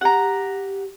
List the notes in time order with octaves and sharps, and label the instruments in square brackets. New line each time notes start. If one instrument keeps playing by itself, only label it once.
[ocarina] G4 [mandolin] F#5 A#5